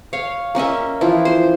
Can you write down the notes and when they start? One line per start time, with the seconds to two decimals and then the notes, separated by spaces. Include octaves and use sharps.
0.13 C#5 F5
0.55 A#3 C#4 D#5 E5
1.01 E3 F3 E4
1.25 C5